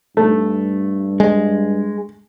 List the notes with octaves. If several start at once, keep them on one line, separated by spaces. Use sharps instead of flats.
G2 A3
G#3